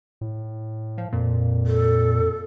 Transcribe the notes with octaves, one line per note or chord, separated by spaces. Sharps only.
A2
F3
F2 A#2
A4